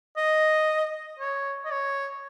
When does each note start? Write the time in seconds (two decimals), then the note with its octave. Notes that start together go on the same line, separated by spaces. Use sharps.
0.17 D#5
1.19 C#5
1.65 D#5
1.71 C#5